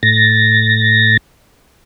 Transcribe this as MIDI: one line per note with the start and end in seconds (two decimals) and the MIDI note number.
0.03 1.17 45
0.03 1.17 93
0.03 1.17 94